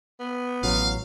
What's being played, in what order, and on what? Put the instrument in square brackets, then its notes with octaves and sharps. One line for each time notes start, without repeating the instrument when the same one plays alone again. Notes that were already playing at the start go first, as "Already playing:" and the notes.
[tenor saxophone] B3
[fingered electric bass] A1 [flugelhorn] F#3 [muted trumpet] F5